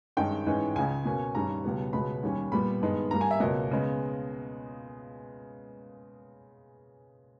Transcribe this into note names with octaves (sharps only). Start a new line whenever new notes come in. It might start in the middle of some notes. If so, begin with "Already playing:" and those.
G2 D#3 G#3 C#4 G5
G#2 E3 G#3 C#4
C#2 C#3 G#3 G#5
B2 A#3 C#4
G2 D#3 G3 C#4 A#5
C#2 B2 G3 B3
C#2 B2 G#3 B3 B5
D#2 D#3 G3 C#4
A#2 G3 B3 B5
G2 D#3 G#3 B3
G2 G3 A#3 A#5
G#5
E5
C#2 B2 A#3 D#5
C#3 G#3 B3